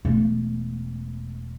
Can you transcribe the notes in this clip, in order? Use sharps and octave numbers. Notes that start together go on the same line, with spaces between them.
E1 A3